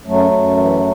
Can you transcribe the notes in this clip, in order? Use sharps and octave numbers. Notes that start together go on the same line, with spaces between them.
F#2 F#3 A3
F#2
E3